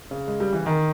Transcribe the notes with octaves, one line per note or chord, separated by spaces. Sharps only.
C#3
G#3
G3
E3
D#3